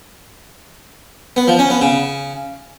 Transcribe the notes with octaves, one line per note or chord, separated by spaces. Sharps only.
B3
F3
C#4
B3
C#3